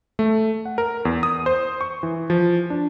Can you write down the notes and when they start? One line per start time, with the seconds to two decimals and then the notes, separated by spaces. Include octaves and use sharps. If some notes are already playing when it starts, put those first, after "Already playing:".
0.19 A3
0.65 F#5
0.78 A#4
1.05 E2
1.23 D#6
1.46 C5
1.81 C#6
2.03 E3
2.30 F3
2.70 D4